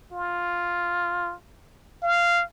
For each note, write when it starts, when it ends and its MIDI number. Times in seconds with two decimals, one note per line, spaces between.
0.13 1.34 65
2.03 2.43 77